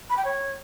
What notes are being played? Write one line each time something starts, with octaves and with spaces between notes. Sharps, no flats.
B5
G5
C#5